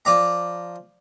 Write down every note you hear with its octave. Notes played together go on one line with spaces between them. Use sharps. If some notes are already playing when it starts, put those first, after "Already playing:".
F3 D5 A#5